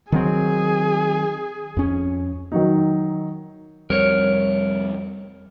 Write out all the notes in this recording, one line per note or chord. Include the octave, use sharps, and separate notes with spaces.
D#3 F#3 C4 G#4
F2 C#4
D#3 F#3 D#4
F2 G3 C4 A#4 C#5